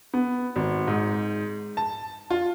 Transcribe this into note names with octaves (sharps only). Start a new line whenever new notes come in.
B3
G#1
G#2
A5
F4